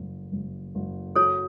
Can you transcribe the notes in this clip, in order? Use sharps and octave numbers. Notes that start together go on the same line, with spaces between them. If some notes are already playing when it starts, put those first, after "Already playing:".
Already playing: F#1
F#1
F#1
F#3 A4 C#5